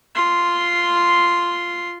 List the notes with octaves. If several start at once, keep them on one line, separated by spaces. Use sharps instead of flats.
F4 C6